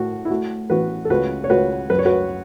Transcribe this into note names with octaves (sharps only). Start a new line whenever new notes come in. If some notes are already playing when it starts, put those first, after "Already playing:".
Already playing: A2 A3 F#4
E4
A3 F#4
A1 F#4 B4
A4
C#2 F#4 B4
C#5
C#2 F#4 B4
F#2 B4
C#5
F#4 B4